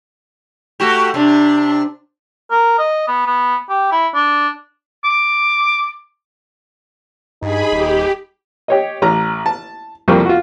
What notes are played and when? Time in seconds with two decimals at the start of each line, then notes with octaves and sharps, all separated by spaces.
0.80 A3 F#4 G4
1.14 C3 D4
2.51 A#4
2.79 D#5
3.08 B3
3.26 B3
3.69 G4
3.92 E4
4.15 D4
5.04 D6
7.42 G2 D#4 G#4 B5
7.72 D#1 G4
8.68 G4 C#5 D#5
9.02 A1 A#5
9.46 A5
10.08 C2 F2 G3 A#3 C4 C#6
10.26 F4 F#4